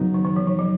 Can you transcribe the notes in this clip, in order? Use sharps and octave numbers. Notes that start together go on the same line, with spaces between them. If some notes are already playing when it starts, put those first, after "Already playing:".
Already playing: F#2 C#3 F#3 B3 D#4
D#3
D#3
E3
F3
F#3